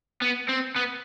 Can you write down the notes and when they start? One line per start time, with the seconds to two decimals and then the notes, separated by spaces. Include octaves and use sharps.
0.22 B3
0.49 C4
0.76 B3